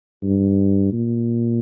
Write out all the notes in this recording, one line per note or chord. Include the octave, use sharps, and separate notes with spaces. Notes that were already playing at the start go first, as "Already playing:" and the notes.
G2
A#2